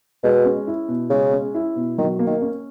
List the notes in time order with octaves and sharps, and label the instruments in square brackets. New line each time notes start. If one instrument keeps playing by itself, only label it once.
[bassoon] B2 [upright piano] G#3
[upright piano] C#4
E4
B2
[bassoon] C#3 [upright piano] G#3
[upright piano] C#4
E4
B2
[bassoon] D#3 [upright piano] F#3
[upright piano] A#3
[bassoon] D#3
[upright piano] C#4